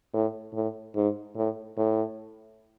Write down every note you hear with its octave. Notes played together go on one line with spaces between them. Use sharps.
A2
A2
G#2
A2
A2